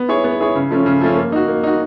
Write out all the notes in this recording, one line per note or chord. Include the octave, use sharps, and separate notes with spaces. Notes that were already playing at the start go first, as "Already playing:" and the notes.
Already playing: B3
E4 G#4 C#5
B3
E4 G#4 C#5
C#3
F3 A3 C#4
C#3
F3 A3 C#4
A#3
D#4 F#4
A#3
D#4 F#4